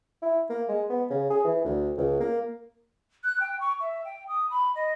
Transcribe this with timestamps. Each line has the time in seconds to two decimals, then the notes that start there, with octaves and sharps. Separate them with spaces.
0.22 E4
0.50 A#3
0.69 G#3
0.90 B3
1.10 C#3
1.31 G#4
1.44 E3
1.65 D2
1.98 C#2
2.20 A#3
3.24 F#6
3.40 G5
3.60 C#6
3.81 E5
4.05 G5
4.28 D#6
4.50 B5
4.75 D#5